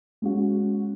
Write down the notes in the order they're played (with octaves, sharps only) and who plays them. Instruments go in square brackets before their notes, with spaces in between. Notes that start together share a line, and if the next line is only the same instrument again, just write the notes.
[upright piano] G#3 C#4 F#4